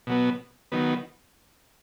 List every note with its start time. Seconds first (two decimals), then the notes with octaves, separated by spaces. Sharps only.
0.07 B2 F#3 B3
0.72 D#3 F#3 B3